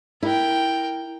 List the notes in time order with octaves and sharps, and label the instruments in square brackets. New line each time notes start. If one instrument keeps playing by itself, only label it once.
[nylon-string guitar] E4 [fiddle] A#4 G5